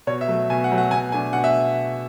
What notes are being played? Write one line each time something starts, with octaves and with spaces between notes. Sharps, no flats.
B2 C#5
E5
F#3 A3
B2 G#5
F#5
F#3 A3
F#5
B2 G#5
A3 D4 G#5
B2 F#5
E5